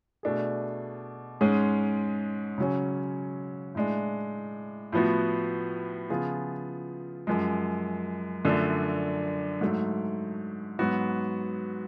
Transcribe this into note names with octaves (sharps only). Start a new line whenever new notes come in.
B2 A3 D4 G#4
G#2 G#3 C#4 G#4
C#3 F#3 C#4
A2 G#3 D4
A2 F3 B3 F#4
C#3 F3 B3 F4 G#4
F#2 F3 G#3
F#2 D3 F3 A3 D4
G#2 F#3 A3
G#2 F#3 B3 F#4